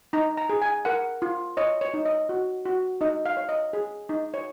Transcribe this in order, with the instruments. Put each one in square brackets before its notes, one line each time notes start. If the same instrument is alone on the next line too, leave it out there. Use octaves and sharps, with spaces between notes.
[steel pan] D#4 A#5
A#5
G#4
G#5
A#4 F#5
F4
C#5 D#5
C#5
D#4
D#5
F#4
F#4
D#4 D#5
F5
C#5
D#5
G#4
D#4
C#5